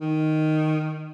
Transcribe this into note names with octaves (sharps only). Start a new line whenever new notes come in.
D#3